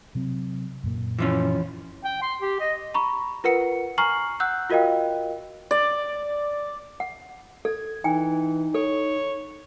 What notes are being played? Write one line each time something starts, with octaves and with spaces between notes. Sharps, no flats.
C3 F#3 C4
F#2 A#2 A#3
E3 F3 C#4
G5
C6
G4
D#5
A#5 B5 C#6
F4 A#4 B4 F#5 C#7
G#5 A#5 C#6 F6 C7 F#7
F#5 E6 F#6 G6
F4 F#4 A#4 D#5 F5 G5
D5
F#5
A4 G#6
E3 D#4 G5 G#5
A4 C#5